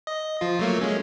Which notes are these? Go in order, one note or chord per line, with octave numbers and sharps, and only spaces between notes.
D#5
F3 F4
F#3 A3 A#3
G#3 C#4